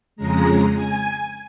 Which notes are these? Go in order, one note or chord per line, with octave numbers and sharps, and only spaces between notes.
F2 C#3 G#3 A#5
G#5